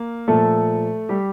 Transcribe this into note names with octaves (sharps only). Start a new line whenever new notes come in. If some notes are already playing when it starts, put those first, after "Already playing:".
Already playing: A#3
A#2 F3 A3 A4
G3 G4